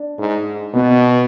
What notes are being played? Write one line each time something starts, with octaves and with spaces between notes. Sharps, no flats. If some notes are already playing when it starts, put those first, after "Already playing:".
Already playing: D4
G#2
B2 B3